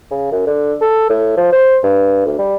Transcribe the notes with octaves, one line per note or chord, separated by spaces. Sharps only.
C#3
F#2
D3
A4
A2
F3
C5
G2
D2
G3